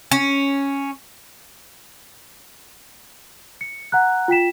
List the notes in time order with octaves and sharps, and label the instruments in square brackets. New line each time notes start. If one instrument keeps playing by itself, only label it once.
[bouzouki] C#4
[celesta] C#7
F#5 A#5 F#6
F4 G5 B6 E7